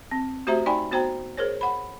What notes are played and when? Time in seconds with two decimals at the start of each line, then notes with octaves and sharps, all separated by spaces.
0.11 C4
0.47 A3 F#4 G4 C5 E5 A#5
0.66 D#4 D5 G5 G#5 B5
0.91 B3 F#4 C5 G5 A#5
1.37 G#4 A#4 C5 C#5
1.61 F#5 B5